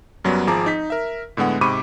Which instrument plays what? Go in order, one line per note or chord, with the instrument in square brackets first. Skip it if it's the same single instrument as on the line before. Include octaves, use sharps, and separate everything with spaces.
[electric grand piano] F#2 F#3 G3 B3
G#1 F3 G#4 A5 A#5 D6
D#4 B6
A#4 E5
A2 D3 G#3 B3 F#5
G#2 C3 B5 C#6 D6 D#7